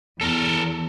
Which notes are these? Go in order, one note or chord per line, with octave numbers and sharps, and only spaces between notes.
E2 A4 A#4